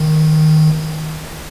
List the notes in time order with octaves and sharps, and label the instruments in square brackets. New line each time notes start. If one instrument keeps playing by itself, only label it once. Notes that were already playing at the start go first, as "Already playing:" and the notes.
Already playing: [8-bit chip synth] D#3